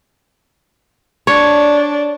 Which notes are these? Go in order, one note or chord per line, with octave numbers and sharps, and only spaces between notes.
D4 C#5